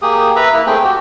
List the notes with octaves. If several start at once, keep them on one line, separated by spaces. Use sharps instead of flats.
A#3 G4 G#4 D#6
B4 E5 A#5 B5
A#3 E4
A3 C4 G#4 G5
F#4 G4